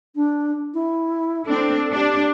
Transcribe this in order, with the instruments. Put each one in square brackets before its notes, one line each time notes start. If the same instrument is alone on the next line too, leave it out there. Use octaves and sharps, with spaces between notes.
[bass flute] D4
E4
[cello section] C4 D4 [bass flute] A4
[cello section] D4 [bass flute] G4